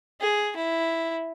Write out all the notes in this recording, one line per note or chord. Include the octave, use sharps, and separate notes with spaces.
G#4
E4